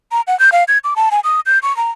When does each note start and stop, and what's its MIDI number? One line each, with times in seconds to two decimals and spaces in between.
0.12 0.21 82
0.27 0.37 78
0.39 0.50 91
0.52 0.64 77
0.68 0.78 92
0.84 0.94 86
0.96 1.09 81
1.11 1.20 80
1.24 1.40 87
1.46 1.59 91
1.63 1.75 85
1.77 1.91 82